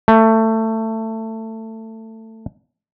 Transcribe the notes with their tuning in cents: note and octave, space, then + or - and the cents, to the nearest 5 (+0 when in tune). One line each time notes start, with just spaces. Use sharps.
A3 +20